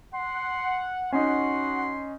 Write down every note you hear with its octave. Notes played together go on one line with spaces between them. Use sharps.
F#5 C6
C#4 D#4 F#4 F#5 C6